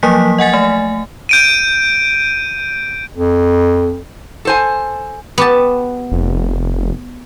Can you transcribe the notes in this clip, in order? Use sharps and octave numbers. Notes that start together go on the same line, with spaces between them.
F3 F#3 A#3 D#6 B6
D#5 F#5 G#5 A6
A3 G#5
G6 D7 D#7
F2
A4 C5 G#5
B3 G4 A5
F1